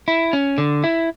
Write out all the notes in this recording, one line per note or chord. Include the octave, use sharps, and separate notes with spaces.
E4
C#4
D3
E4